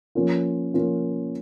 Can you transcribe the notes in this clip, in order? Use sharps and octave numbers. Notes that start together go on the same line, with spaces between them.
F3 A#3 C#4 F4
F3 A#3 C#4 F4